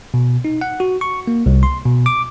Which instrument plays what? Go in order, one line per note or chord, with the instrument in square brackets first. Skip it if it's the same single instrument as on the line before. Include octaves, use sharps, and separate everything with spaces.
[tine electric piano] B2
D#4
F#5
F#4
C#6
A#3
C2
C6
B2
D6